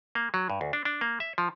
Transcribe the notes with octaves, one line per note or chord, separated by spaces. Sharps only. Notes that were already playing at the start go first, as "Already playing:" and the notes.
A#3
F#3
G2
D2
D4
D4
A#3
E5
F3